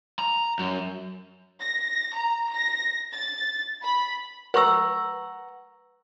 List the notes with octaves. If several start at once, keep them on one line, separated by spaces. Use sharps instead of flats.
A#5
F#2
A#6
A#5
A#6
A6
B5
B4 F#5 A#5 C#6 E6